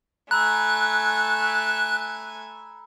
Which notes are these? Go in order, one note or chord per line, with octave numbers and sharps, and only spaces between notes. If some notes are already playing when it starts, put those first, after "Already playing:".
A3 G#5 A#5 B5 E6 F#6